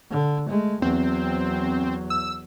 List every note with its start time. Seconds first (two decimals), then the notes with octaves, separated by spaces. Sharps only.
0.11 D3
0.47 G#3 A3
0.82 E2 F#3 C4
2.10 E6